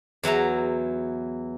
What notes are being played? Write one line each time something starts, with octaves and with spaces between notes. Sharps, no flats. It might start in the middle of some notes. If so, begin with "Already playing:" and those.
E2 F#3 E4 A#5